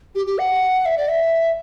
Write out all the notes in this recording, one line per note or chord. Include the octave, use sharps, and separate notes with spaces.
G4
G4
F#5
E5
D5
E5